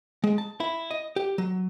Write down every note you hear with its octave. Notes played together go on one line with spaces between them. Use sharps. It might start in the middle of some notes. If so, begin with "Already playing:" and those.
G#3
A5
E4
D#5
G4
F#3